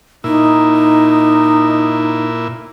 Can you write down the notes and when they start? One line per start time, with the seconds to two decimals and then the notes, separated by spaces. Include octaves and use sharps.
0.24 A#2 D#4 E4